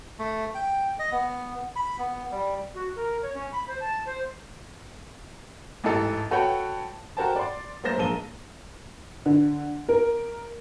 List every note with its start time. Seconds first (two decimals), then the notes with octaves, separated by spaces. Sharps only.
0.19 A3
0.55 G5
0.99 D#5
1.12 B3
1.76 B5
1.99 B3
2.31 G3
2.74 F#4
2.95 A#4
3.22 C#5
3.34 C#4
3.52 B5
3.67 C5
3.80 A5
4.05 C5
5.84 A1 G#2 E3 A4 A5
6.31 F#4 A4 B4 C#5 F#5 G5
7.17 F#4 A4 A#4 C5 G5 A5
7.36 D5 C6
7.84 F#3 A3 A#3 C5 A#6 E7
7.98 A#1 G#3 A#3 A5 D#7 G7
9.26 D3
9.89 A#4